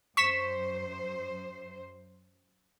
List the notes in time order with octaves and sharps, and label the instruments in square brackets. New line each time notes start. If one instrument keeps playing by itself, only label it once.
[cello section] F#2 C5 [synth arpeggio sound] C#6 B6 E7